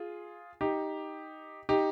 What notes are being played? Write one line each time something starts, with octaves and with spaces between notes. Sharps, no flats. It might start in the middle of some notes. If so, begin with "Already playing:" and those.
Already playing: F4 G#4
D#4 G4
D#4 G4